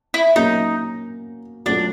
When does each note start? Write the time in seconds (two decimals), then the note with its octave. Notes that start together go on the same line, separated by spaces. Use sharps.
0.14 E4
0.36 F#3 A#3 C#4 D#4
1.66 F#3 A3 C#4 D4 F4 A4